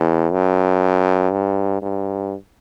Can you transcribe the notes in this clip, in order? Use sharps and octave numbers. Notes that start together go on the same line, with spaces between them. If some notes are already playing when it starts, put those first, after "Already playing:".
Already playing: E2
F#2
G2
G2